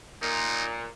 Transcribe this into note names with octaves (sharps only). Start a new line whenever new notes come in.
A#2 D#4